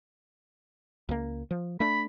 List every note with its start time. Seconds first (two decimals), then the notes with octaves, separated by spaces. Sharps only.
1.09 C#2 A#3
1.51 F3
1.80 A3 D4 B5